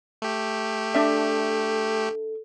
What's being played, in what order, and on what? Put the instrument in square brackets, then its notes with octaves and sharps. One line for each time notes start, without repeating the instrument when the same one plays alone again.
[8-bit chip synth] A3 G4
[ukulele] D4 E5 [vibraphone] A4